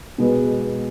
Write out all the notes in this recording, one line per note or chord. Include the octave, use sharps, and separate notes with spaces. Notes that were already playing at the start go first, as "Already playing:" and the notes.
B2 G#3 B3